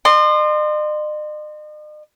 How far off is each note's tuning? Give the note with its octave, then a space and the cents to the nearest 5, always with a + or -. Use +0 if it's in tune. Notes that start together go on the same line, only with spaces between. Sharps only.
D#5 -45 C6 +0